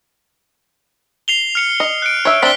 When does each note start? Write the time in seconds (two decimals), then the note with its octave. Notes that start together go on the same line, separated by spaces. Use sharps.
1.28 C7 F7 G7
1.55 F6 C#7 F7
1.80 D#5
2.02 F#6 C#7 D7
2.25 C#5 E5
2.42 C4 D4 E5 B6 G7